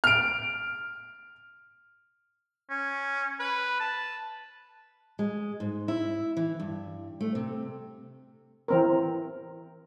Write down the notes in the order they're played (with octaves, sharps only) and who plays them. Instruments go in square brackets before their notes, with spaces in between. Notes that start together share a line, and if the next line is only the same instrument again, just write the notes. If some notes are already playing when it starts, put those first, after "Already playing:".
[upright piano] F6 D7
[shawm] C#4
B4
A5
[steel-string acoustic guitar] G#3
G#2
E4
E3
G2
A3
C3
[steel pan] E3 C4 A#4